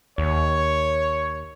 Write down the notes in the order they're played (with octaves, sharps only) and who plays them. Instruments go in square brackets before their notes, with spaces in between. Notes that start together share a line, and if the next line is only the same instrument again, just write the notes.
[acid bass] D#2 [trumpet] C#5